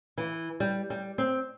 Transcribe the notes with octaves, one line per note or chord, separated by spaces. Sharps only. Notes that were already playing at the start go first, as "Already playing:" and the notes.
E3
G3
G3
C4